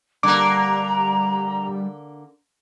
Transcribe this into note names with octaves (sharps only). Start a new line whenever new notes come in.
D3 G3 A#3 A#5 D6